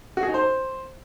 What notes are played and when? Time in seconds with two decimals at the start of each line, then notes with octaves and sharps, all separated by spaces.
0.17 F#4
0.23 G#4
0.28 D#4
0.34 C5